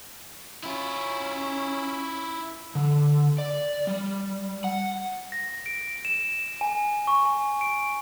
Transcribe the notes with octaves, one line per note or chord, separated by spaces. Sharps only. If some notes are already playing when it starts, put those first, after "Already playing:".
C#4 E4 F4
D3
D5
G3
F#5
A#6
D7
E7
G#5
C#6
G#5
D7